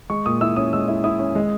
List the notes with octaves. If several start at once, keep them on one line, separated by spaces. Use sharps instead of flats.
G#3 C#6
A#2 D#6
E4 E6
C#4 D#6
G#3 E6
E4
E4 D#6
C#4
G#3